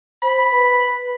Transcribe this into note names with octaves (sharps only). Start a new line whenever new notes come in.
C5 B5
B4